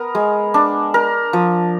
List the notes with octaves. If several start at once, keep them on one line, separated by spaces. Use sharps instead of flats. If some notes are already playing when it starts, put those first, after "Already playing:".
Already playing: B3 A#4
G#3
D4
A#4
F3